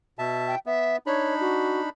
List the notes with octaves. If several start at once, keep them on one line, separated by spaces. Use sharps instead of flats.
B2 E5 A5
G5
B3 E5
D4 D#4 C#5 B5
F#4